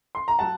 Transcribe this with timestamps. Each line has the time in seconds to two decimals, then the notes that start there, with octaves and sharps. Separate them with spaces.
0.15 C6
0.28 A#5
0.39 F#3 F#5 A5